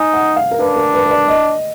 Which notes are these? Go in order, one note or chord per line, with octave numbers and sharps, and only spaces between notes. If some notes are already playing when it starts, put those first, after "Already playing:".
Already playing: D#4 G#5
F#5
F5
A#4
D4 B4
A#4
B4
B4
D5
D#5